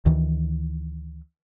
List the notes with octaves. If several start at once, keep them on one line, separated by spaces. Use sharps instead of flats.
D2 D#3 E3